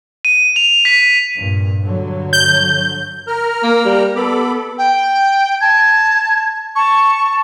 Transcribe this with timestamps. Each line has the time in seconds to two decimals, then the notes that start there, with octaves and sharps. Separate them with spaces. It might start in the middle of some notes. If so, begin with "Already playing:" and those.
0.25 D#7
0.56 F7
0.85 B6
1.38 G2 A#2
1.83 G2 D3 F#3
2.33 G6
3.28 A#4 A#5 F6
3.63 A#3
3.85 G3
4.16 B3 A4 B5 D6
4.78 G5
5.61 A5 G#6
6.75 A5 C#6